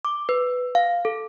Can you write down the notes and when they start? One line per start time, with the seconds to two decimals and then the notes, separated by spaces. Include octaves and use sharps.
0.05 D6
0.29 B4
0.75 F5
1.05 A4